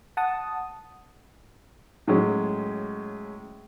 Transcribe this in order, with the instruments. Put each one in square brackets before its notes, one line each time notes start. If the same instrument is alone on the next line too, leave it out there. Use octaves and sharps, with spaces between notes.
[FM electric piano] F#5 A5 D#6
[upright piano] A2 F#3 G#3 C#4